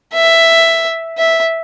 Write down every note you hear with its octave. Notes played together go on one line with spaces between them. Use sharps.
E5
E5